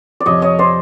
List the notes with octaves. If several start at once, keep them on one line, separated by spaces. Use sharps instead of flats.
D5
F2 C3 F3 C#5 D#5
C#5 D#5
C5 D5